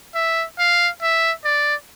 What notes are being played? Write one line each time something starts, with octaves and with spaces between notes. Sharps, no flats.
E5
F5
E5
D5